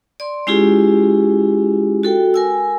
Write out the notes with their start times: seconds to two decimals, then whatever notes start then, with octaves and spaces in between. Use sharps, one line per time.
0.20 D5 C6
0.47 G#3 C#4 E4 F4 G4 G#4
2.03 F#4 A4 G5
2.34 A#4 G#5 E6